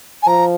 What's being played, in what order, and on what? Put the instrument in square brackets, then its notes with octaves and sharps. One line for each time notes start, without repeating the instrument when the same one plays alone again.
[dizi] G#5
[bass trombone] F3 [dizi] A#5